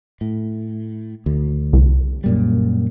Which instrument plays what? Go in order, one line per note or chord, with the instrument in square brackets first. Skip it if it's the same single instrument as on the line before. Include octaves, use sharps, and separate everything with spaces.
[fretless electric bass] A2
D2
[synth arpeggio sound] C2
[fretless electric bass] F#2 A#2 G3